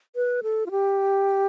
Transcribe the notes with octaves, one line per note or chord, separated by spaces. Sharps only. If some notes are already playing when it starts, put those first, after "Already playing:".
B4
A4
F4
G4